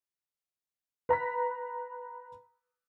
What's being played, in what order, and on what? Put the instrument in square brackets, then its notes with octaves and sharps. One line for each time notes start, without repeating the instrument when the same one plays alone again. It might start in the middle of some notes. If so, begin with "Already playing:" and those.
[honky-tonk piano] B4 A#5 B5 B6